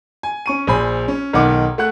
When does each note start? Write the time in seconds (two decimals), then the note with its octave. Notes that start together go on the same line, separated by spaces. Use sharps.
0.23 G#5
0.46 C#4 C#6 D#7
0.67 A#1 C5 G#5 B5
1.08 C#4
1.33 B1 D#3 F#5 D6
1.78 A3 F#5 F#6